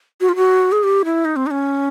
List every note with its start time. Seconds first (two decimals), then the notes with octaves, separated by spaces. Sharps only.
0.21 F#4
0.29 F4
0.36 F#4
0.72 G#4
0.84 G4
1.05 E4
1.25 D#4
1.36 C4
1.47 D#4
1.51 C#4